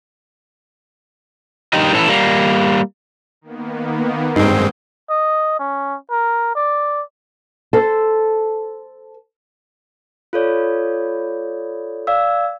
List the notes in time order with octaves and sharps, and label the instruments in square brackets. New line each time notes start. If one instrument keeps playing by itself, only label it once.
[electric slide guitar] G2 D#4 G4 A#4 D#5
E3 C#4 A4
G3 A#3
[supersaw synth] D#3 A#3 B3
[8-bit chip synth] G2 G#3 [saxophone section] D#3 C4 [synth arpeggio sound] D#4 [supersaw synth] F#5 G#5 G6
[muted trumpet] D#5
C#4
A#4
D5
[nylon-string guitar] A4 C5
[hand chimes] F4 A4 C#5 D5
D5 F5 E6